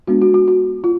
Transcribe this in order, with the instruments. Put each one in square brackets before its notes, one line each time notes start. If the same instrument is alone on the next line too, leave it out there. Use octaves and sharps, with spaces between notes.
[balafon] G#3 B3 D4 F#4
F#4
F#4
F#4
F4